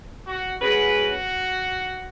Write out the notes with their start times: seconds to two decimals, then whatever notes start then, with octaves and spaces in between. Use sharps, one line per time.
0.27 F#4
0.61 G#3 C#4 F#4 B4
0.95 F#4